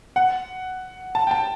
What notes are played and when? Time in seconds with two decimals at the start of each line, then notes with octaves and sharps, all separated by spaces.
0.16 F#5
1.15 A5
1.27 G5
1.31 A5